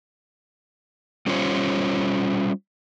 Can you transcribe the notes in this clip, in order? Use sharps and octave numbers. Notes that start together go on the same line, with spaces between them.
G3 C#4 F4 C5 C#5